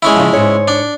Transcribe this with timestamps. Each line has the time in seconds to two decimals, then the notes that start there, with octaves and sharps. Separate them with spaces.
0.02 G#3 C#4 E4
0.16 C#3 F3
0.33 G#2 C#5
0.68 D4